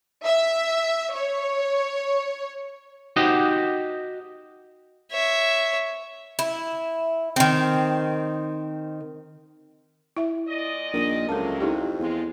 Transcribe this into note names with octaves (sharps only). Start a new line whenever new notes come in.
E5
C#5
D#4 F#4 G4 C5 D#5
C#5 E5
E4
D#3 C4
E4 E5
A#2 D5 D#5
A#1 D#3
C#2 C3 F#3 A#3 A4 A5
F2 D#4 E4 G4
E2 G#3 C4 F4